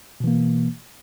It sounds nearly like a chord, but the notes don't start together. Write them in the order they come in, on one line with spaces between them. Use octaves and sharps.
B2 E3 A#3